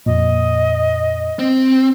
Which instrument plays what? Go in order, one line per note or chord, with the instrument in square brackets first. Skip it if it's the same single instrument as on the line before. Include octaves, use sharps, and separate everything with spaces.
[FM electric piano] F2 A#2 [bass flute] D#5
[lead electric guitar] C4